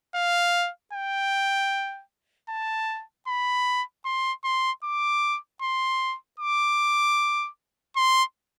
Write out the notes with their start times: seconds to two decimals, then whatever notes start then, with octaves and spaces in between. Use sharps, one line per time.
0.15 F5
0.93 G5
2.49 A5
3.28 B5
4.05 C6
4.44 C6
4.84 D6
5.62 C6
6.40 D6
7.96 C6